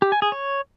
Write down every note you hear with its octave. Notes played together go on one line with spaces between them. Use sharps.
G4
G#5
G#4
C#5